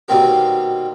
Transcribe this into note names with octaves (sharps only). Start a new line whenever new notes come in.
B2 D#3 G3 A#3 C4 G4